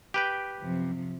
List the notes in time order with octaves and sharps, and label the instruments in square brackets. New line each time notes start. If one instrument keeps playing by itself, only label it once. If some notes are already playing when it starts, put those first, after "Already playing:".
[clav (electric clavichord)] G4 B4 G5
[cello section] F#2 C3 F3